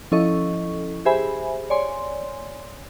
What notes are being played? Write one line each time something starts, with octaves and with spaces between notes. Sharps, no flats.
F3 C#4 E4 A4 D#5 C#6
G4 G#4 C5 E5 G#5 B5
C#5 D5 G#5 C6